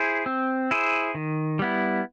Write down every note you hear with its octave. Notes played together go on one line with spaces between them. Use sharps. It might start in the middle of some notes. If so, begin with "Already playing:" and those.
Already playing: E4 G#4 C5
C4
E4 G#4 C5
D#3
G3 B3 E4